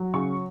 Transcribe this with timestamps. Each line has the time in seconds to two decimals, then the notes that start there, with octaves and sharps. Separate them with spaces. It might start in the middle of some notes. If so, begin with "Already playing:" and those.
Already playing: F#3
0.14 C#3 C#6